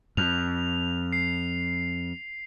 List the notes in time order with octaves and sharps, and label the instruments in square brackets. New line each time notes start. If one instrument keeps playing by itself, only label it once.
[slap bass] F2 [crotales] F7
[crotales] C7